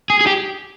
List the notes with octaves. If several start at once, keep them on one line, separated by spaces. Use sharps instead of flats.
G#4
G#4
G4